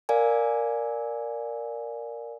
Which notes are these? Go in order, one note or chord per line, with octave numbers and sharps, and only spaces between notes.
A#4 D5 F5 G#5